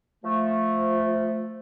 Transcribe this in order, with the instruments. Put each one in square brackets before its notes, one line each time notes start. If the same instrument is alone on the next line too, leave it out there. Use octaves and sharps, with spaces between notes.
[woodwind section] F3 A3